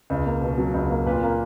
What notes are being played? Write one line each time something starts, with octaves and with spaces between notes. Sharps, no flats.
C#2
A#3
B2
F#3
C#2
A#3
A#2 B4
A#3